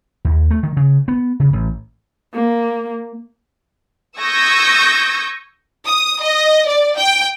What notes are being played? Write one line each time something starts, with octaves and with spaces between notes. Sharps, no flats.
D#2
A3
D#3
C#3
B3
C#3
A1
A#3
C#6 D#6 E6 G6 G#6 A#6
D#6
D#5
D5
G5